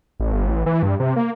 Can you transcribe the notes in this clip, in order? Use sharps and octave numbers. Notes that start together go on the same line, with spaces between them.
A1
G1
A1
E3
G2
C3
A#3